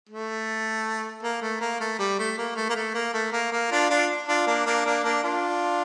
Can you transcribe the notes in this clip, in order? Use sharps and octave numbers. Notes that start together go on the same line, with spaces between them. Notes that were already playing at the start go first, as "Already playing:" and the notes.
A3
A#3
A3
A#3
A3
G3
A3
A#3
A3
A#3
A3
A#3
A3
A#3
A#3
D4 F4
D4 F4
D4 F4
A#3 D4
A#3 D4
A#3 D4
A#3 D4
D4 F4